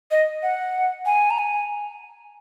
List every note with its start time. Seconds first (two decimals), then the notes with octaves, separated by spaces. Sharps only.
0.11 D#5
0.43 F#5
1.06 G#5
1.30 A#5
1.39 G#5